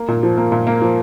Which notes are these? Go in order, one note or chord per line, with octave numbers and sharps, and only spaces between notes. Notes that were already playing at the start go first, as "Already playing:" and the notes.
Already playing: A#3
A#2
F3
A#3
A#2
A#3
F3